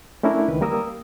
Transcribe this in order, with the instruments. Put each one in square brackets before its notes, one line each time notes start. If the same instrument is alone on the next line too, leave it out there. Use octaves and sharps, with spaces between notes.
[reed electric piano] A3 C#4 D4 E4 A#4
C#2 D#3 B4
G3 A#3 A#4 D#6 E6